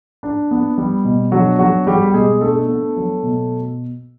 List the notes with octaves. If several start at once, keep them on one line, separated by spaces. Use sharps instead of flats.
D4
B3
G3
B2
F#3 D4 F#4
F#3 B3 F#4
G3 G4
G4
B2 G#3 G#4
A3 D4 A4
B3
F#3
B2